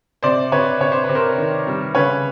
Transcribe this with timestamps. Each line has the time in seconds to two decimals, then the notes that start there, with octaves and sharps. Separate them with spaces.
0.23 C3 C5 D5
0.52 C3 B4 C#5
0.80 C3 C#5
0.92 C5
1.04 B4
1.09 C3
1.15 A#4 C5
1.38 D#3
1.67 G3
1.95 C#3 B4 C#5